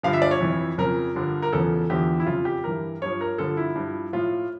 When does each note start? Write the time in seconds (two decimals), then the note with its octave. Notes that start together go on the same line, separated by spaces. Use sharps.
0.03 G2 D3 F3 F5
0.13 E5
0.22 D5
0.31 C#5
0.41 F2 E3
0.78 F2 C#3 F3 A#4
1.15 G2 D3 F3
1.42 A#4
1.53 E2 C#3 F3 A4
1.90 E2 D3 F3 G4
2.20 E4
2.27 F2 C#3 F3 F4
2.45 G4
2.64 G2 E3 A#4
3.01 G2 F3 C#5
3.21 A#4
3.38 G2 D3 F3 A4
3.57 E4
3.75 G2 F3
4.13 A2 F3 F4